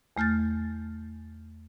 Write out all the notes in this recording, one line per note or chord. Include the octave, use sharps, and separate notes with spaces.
E2 A3 F6 G6 A6